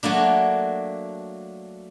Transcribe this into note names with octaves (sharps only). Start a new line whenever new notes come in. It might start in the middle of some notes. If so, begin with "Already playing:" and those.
F#3 A3 A#3 D4